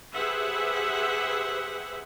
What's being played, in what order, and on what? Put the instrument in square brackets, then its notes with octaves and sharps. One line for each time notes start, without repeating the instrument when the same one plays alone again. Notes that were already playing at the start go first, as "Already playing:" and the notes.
[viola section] G4 G#4 B4 C5 E5 F#5